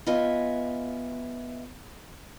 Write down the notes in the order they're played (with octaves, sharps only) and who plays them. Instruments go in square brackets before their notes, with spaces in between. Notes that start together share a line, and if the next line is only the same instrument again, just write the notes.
[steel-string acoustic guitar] B3 F4 D#5 E5 G#5